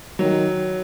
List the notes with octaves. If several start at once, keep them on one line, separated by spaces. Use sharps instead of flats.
D#3 F#3